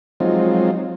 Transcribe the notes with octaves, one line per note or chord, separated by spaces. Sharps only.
F3 F#3 G#3 C4 D#4 F4